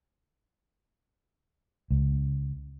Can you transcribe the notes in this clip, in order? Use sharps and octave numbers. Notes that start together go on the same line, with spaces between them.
C#2